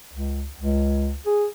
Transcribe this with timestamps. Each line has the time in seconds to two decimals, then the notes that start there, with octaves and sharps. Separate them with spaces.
0.13 C#2
0.59 C#2
1.26 G#4